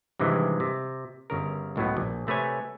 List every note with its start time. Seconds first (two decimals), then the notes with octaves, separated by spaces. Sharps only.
0.19 G2 C3 D#3 E3 G#3
0.60 C3
1.30 G1 C#3 A#4
1.76 C#2 A2 F#3 B3
1.97 A#1
2.27 C3 A3 B4 C#5 G#5